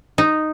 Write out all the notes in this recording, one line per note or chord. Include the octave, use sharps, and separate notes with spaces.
D#4